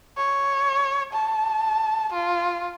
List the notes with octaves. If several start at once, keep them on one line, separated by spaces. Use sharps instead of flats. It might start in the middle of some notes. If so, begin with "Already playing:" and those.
C#5
A5
F4